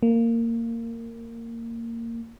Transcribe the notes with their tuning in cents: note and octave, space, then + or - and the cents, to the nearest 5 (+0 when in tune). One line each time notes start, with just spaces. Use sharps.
A#3 -15